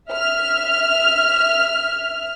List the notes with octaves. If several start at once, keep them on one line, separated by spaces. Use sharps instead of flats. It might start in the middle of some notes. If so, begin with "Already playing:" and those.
E5 F6